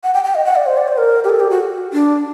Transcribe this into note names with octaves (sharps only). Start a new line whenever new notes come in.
F#5
G5
G5
D#5
F#5
D5
C5
D5
C5
A#4
G4
A4
G4
F#4
D4